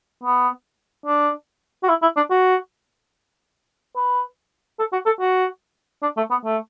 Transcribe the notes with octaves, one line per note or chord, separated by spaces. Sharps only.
B3
D4
F#4
E4
E4
D4
F#4
B4
A4
F#4
A4
F#4
D4
A3
B3
A3